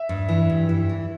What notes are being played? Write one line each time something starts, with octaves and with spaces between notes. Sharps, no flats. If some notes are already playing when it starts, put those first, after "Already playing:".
Already playing: E5
G2
E3
G2
E3
E3